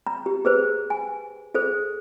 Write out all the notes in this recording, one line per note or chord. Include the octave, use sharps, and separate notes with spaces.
A#5
G4
G#4 B4 C5
G#5
G#4 A4 C5